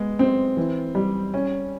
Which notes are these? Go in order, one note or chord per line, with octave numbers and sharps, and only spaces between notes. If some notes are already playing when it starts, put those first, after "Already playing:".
Already playing: G#3 B3
C4
E3
G3
C#4